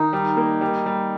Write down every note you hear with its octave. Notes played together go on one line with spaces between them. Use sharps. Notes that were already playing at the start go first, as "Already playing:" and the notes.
Already playing: D#3 D#4
G3
A#3
G3
G3